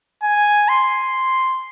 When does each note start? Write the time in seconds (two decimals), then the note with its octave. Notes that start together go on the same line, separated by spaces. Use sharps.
0.23 G#5
0.69 C6